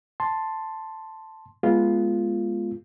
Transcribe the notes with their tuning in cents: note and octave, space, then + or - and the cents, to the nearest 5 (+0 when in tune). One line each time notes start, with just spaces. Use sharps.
A5 +0 C6 +0
G#3 +5 B3 -20 F4 -10